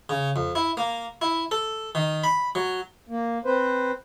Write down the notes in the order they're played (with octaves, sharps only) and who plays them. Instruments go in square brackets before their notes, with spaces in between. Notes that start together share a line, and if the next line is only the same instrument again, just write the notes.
[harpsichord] C#3
F2
E4
A#3
E4
A4
D#3
B5
F#3
[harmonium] A#3
C4 B4 C5